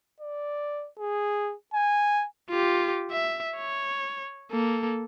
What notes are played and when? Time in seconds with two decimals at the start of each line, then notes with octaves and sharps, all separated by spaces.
0.21 D5
0.99 G#4
1.74 G#5
2.50 F4 G4
3.12 E5
3.57 C#5
4.51 A#3 A4